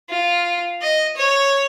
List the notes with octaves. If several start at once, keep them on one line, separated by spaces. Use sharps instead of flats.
F4
D#5
C#5